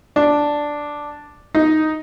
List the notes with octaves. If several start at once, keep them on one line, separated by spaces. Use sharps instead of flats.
D4
D#4